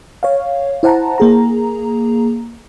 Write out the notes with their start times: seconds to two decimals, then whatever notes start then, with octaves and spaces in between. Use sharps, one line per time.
0.23 C#5 F5
0.83 E4 C5 F#5 A5 A#5
1.18 A#3 G#4 A#5